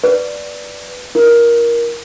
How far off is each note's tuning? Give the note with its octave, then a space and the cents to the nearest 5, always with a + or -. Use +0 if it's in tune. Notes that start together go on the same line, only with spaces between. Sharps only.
B4 +0 D5 +0
E4 +0 A#4 +15